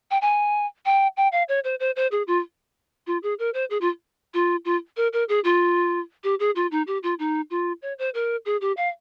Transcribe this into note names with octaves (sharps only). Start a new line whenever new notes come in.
G5
G#5
G5
G5
F5
C#5
C5
C5
C5
G#4
F4
F4
G#4
A#4
C5
G#4
F4
F4
F4
A#4
A#4
G#4
F4
G4
G#4
F4
D#4
G4
F4
D#4
F4
C#5
C5
A#4
G#4
G4
F5